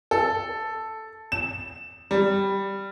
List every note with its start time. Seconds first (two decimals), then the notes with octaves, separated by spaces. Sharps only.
0.11 A4
1.32 E7
2.11 G3